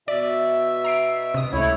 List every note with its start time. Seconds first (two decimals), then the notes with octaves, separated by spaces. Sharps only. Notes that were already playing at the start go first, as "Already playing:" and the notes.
0.08 B2 D5 E5
0.85 A#5 C7 D7
1.34 C3 D#6
1.53 C#2 A3 E4 C#5